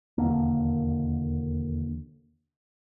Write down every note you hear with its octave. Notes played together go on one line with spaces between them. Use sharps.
E1 D#2 D3 A#3